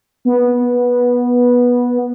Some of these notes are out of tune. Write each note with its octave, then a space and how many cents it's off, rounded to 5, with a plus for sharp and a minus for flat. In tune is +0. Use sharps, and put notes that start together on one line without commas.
B3 -15